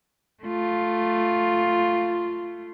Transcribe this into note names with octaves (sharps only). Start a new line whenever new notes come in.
A3 F4